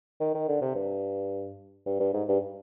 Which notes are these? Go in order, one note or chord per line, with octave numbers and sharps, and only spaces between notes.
D#3
D#3
D3
C3
G2
G2
G2
G#2
G2